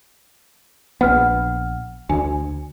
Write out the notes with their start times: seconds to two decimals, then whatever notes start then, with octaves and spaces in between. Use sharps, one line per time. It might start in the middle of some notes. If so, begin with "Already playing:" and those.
1.01 A#1 B3 F#5 F6
2.09 D2 G#5